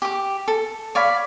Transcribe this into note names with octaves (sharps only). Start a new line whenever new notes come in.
G4 D6
A4
C#5 D5 F5 B5